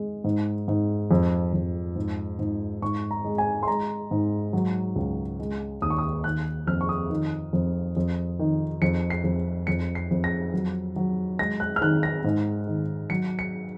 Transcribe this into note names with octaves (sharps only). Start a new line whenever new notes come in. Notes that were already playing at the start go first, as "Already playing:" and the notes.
Already playing: G#3
G#2
G#2
F2
F2
G#2
G#2
G#2 C#6
A#5
G#3
G#5
C6
G#3 A#5
G#2
F#3
C#2
G#3
D#2 D#6
C#6
D#6
D#3 F#6
F2 F6
C#6
D#6
D#3
F2
F2
D#3
F2 C#7
C7
F2
F2 C#7
C7
F2
A#6
F#3
F#3
G#3 A#6
F#6
F6
D#3 F#6
A#6
G#2
D#3
F#3 C#7
C#7